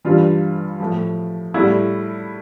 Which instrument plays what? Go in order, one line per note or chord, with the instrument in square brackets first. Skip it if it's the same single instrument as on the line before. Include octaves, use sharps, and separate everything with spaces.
[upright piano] G2 E3 G3 F4
A2 F3
A2 G3 E4